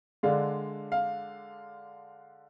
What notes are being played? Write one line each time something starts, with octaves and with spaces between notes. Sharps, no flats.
D3 G#3 D4 F5
F5